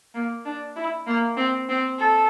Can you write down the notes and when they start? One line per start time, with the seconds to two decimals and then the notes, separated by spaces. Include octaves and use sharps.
0.15 A#3
0.45 D4
0.76 E4
1.07 A#3
1.37 C4
1.69 C4
1.99 A4